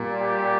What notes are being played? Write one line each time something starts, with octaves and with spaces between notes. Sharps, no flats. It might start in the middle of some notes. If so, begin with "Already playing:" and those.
Already playing: A#2 G3
G4